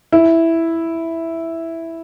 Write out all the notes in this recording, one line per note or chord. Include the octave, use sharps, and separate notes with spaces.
E4